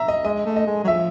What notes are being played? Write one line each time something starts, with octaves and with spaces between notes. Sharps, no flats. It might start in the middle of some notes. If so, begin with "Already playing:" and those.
Already playing: E5 A#5
D#5
G#3 D#5
A3
D#5
G#3
F#3
F3 E5